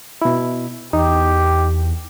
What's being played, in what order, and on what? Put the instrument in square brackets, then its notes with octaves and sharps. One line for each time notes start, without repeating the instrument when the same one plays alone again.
[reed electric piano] B2 E4
[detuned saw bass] E2 [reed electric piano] D#4 [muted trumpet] G4